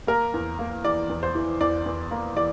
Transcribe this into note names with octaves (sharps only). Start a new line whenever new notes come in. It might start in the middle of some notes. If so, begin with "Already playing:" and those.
A#3 A#4
E2
A#3
E3 D5
E2
C5
E3
E2 D5
E2
A#3
E3 D5